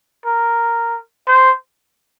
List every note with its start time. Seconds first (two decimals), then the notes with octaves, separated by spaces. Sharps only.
0.26 A#4
1.27 C5